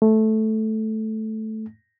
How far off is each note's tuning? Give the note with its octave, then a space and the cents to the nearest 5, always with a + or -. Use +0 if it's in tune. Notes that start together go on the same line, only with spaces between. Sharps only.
A3 -10